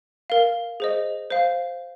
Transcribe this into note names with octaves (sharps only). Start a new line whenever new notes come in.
A#4 F5
G#4 C5 D#5
C5 F5